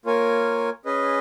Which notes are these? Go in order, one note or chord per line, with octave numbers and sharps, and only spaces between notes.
A#3 F4 A#4 C#5 G#5
C#4 G#4 B4 D#5